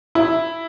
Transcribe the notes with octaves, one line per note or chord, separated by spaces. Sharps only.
E4